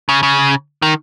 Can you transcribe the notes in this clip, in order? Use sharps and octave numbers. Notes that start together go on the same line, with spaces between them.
C#3
C#3
D#3